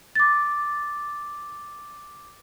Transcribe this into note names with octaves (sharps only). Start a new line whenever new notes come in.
D6 A6